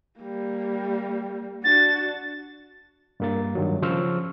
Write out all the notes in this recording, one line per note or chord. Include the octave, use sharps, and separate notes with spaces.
G3 A#3
D4 F#4 A6
G2 A#3 A6
G2 D#3 F#3
C#3 F3 C5 C#6 E6 F6